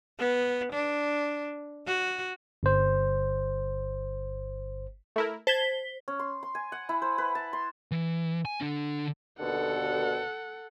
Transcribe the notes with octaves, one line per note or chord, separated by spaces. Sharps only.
B3
D4
F#4
G1 C5
A3 E4 A#4
C5 A5 G#6 B6 G7
C#4
C6
C6
G#5
F#5
E4
C5
B4
A5
C6
E3
G#5
D3 D4
D#2 B2 D3 A4 F#5